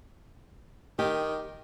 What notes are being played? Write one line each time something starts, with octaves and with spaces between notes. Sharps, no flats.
D#3 G4